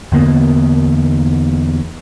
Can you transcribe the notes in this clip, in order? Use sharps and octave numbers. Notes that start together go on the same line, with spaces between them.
E2 D3 A#3 B3